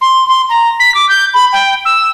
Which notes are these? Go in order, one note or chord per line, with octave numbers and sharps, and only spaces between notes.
C6
C6
A#5
B6
D6
G6
B5
G5
E6